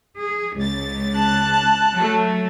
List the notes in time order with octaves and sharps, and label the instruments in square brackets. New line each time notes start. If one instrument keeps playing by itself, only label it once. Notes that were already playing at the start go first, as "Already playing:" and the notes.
[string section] G#4
C#2 A6
[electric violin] A5 F#6
[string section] F#3 A3